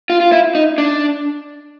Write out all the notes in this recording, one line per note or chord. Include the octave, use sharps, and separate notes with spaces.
F4
F4
E4
D#4
D4